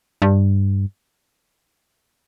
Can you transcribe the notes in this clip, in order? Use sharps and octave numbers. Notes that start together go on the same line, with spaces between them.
G2